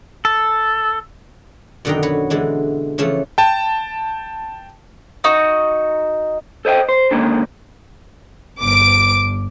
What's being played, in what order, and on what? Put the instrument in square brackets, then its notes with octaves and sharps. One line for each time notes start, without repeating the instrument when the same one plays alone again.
[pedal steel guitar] A4
[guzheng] F#2 B2 D3 D#3 G5 A#5
F#4 B4 C#5
D3 E3 G#3 D4
C#3 E3 F3 A3 C#4
[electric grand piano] G5 A5
[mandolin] D#4 F#4
[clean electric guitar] A4 C5 D#5 E5 G5
C5
D3 D#3 G#3 A#3 C#4 D#4
[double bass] G1 G2 [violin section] D6 D7